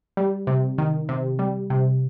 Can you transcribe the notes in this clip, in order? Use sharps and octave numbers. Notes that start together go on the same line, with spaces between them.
G3
C3
D#3
C3
G3
C3